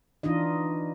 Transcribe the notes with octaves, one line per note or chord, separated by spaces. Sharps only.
E3 D4 D#4 F4 D#5